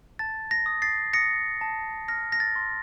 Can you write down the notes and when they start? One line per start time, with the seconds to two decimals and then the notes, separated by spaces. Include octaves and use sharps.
0.19 A5 A6
0.51 A#6
0.66 D#6
0.82 A6 C7
1.13 D#6 A#6 C#7
1.61 A5
2.08 F6 A#6
2.32 A#6
2.40 A6
2.56 C6